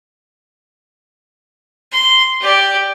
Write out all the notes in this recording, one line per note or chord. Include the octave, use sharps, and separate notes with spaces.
C6
G4 D5